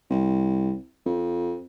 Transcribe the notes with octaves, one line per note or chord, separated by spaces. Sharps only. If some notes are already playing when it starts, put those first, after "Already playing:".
C2
F2